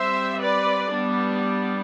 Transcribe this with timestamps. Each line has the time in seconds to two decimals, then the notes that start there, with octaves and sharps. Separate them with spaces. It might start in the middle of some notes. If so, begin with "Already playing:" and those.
Already playing: G3 C4 C5 E5
0.40 B4 D5
0.92 G3 B3 D4